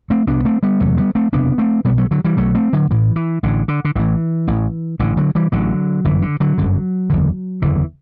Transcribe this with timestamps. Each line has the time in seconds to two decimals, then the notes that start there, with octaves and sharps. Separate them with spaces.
0.10 A3 C4
0.27 C2 C3 B3 D4
0.45 A3 C4
0.63 G3 B3
0.80 F#1 E2 C3 F#3 A3
0.97 G3 B3
1.15 A3 C4
1.32 F#1 E2 C3 B3 D4
1.58 A3 C4
1.84 B1 B2 G3 B3
1.98 F#3 A3
2.11 D3 F#3
2.25 E3 G3
2.37 B1 B2 F#3 A3
2.55 A3 C4
2.73 D3 F#3
2.91 A1 A2 E3
3.16 E3
3.43 A1 A2 D3
3.68 D3
3.85 D3
3.95 A1 A2 E3
4.47 A1 A2
4.99 A1 A2 D3
5.17 D3 F#3
5.35 E3 G3
5.52 A1 A2 D3 F#3
6.04 G1 F#2 D3 E3
6.22 D3
6.40 D3 F#3
6.58 G1 F#2 D3
7.10 F#1 E2 D3
7.62 F#1 E2 D3 E3